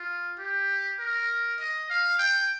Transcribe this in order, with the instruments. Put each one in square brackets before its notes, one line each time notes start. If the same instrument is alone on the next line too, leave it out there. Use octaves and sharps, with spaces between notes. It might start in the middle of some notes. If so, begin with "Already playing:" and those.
Already playing: [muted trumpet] F4
G4
A#4
D#5
F5
G5